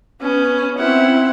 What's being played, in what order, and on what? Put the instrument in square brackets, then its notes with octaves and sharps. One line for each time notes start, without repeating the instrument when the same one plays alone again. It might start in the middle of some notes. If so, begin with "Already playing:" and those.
[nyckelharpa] B3 [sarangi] C#4
[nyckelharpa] C4 F#5 [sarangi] E4